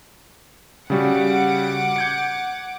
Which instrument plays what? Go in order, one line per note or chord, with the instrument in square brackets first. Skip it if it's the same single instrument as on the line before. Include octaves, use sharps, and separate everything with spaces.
[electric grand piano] C#3 G3 F#4 [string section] F#5 D6
[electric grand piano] G6 G#6 C#7